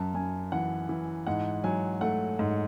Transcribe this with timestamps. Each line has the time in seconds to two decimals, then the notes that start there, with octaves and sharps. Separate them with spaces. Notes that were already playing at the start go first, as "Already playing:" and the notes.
Already playing: F#2 A5
0.14 F#2 G#5
0.52 E3 F#5
0.89 E3
1.27 G#2 F#5
1.64 F#3 G#5
2.01 A3 F#5
2.39 G#2